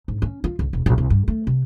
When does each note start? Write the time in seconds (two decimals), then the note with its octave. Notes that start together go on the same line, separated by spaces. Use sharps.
0.08 G#2
0.22 C#4
0.44 F4
0.59 C#2
0.73 E1
0.86 A#1
0.98 C2
1.10 G2
1.28 A3
1.47 C3